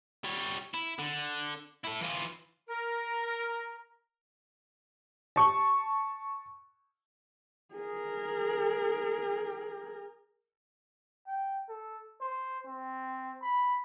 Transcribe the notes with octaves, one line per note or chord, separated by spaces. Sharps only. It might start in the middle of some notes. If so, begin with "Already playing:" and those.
G3 C#5
E4
D3
E4 A4
E3 F4
A#4
A5 C#6
G#4 A#4
G5
A4
C5
C4
B5